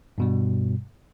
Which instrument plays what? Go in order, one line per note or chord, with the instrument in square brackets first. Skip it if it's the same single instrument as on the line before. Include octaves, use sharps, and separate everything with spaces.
[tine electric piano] G2 B2 G3